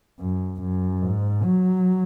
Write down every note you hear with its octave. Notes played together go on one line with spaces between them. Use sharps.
F#2
F#2
G#2
F#3